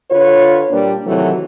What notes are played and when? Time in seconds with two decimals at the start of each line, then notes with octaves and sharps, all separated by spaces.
0.11 D3 F4 B4 C#5
0.70 A#2 G3 A#3 D4 B4
1.07 C3 D#3 E3 F#3 A3